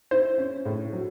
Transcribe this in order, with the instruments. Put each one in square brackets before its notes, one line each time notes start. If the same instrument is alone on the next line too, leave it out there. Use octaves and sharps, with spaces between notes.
[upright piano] E4 [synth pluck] C5
[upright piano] C#4
A2
F#3